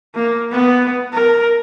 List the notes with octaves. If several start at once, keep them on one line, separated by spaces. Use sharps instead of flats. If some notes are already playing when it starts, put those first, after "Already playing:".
A#3
B3
A#4